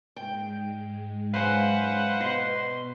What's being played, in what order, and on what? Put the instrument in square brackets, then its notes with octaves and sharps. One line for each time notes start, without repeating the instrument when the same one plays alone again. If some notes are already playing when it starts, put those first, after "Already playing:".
[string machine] G#2 G#3 [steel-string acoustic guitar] G5
[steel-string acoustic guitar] F#2 G#5 [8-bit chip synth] B4 C5 F#5 [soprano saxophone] F5
[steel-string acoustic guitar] B2 [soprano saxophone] C6